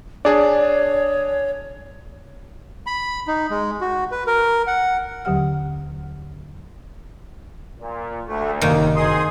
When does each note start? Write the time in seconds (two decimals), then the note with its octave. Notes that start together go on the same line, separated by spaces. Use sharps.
0.25 D4 G#4 C#5 D5 A5
2.87 B5
3.28 D#4
3.50 G#3
3.81 F#4
4.12 B4
4.27 A#4
4.67 F#5
5.25 D#2 D3 F#3 G4 F#5 F6
7.80 A#2
8.27 D2 A3
8.61 F#1 D#2 C3 D#3 A#3
8.96 C4 D#4 G#4 C6 D#6